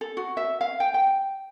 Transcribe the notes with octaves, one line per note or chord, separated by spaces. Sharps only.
A4
F#4
E5
F5
G5
G5